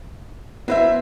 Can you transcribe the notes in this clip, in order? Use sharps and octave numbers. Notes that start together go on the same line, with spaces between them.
F#3 B3 E4 B4 C5 E5